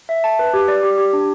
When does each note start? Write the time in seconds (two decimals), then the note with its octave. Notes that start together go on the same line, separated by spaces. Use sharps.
0.09 E5
0.24 A5
0.39 B4
0.54 G4
0.68 D5
0.83 G4
0.98 G4
1.13 D4